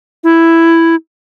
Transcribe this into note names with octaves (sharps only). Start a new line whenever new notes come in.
E4